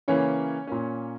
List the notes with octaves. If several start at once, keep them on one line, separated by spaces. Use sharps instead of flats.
C#3 E3 A#3 C#4 C#5
A#2 A#3 C#4